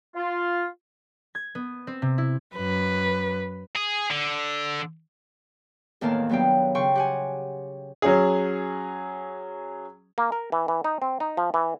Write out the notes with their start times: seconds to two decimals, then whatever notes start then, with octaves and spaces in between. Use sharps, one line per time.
0.15 F4
1.35 G#6
1.55 B3
1.87 C4
2.02 C3
2.18 E4
2.56 F#2 B4
3.76 G#4
4.11 D3
6.01 E2 A2 D#3 A#3 F5 A5
6.29 G2 F#3 B3 F5 G5
6.75 C#3 G5 C6 C#6
6.95 G4 F#5 G#5
8.02 F#3 C#4 G#4
10.18 A#3
10.32 A#4
10.52 E3
10.68 E3
10.84 D#4
11.02 C4
11.20 D#4
11.37 F3
11.54 E3